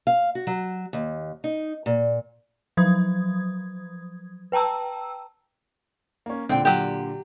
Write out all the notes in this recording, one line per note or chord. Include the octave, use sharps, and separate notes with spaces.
F5
F#4
F#3
D#2
D#4
A#2
F3 F#3 D#6 G#6
B4 G5 A5 A#5 E6
A#3 C#4
A#2 D3 C4 G5
F#3 G4